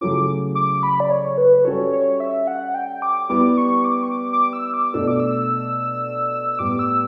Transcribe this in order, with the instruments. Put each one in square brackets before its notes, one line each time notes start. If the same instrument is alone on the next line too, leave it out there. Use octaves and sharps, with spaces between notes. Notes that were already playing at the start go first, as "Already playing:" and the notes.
[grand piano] C#3 F#3 A3 C#4 E4 [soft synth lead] D6
[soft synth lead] D6
B5
D5
C#5
B4
[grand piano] G3 C#4 F#4 A4 [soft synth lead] C#5
[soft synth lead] C#5
E5
F#5
G5
D6
[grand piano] G3 B3 E4 G4 [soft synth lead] D6
[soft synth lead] C#6
D6
C#6
D6
D6
E6
D6
[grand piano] B2 A3 D4 [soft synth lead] E6
[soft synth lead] D6
E6
E6
[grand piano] A2 G3 B3 [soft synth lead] D6
[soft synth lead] E6